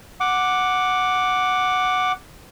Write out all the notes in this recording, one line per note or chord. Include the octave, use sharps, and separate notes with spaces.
F#5 D6